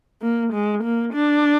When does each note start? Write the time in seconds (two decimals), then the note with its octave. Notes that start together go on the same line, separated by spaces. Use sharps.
0.22 A#3
0.53 G#3
0.84 A#3
1.14 D4